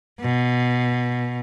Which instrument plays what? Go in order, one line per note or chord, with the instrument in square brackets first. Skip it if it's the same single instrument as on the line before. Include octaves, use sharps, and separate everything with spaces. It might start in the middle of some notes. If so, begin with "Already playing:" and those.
[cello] B2